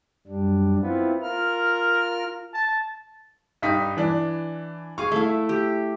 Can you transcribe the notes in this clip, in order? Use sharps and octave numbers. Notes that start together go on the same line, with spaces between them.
F#2 G3 D4
B3 C4 E4 F4
F4 A#4 F6
A5
G2 D#4 B6
E3 D4
G#4 F5 C#6
A3 E4 E5
G4